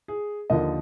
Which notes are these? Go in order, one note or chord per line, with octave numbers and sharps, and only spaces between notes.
G#4
D#2 D3 F3 A#3 D#5